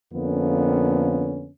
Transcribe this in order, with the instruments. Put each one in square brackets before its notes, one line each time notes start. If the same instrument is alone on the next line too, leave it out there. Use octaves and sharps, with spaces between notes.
[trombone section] F2 D3 A#3 B3 C#4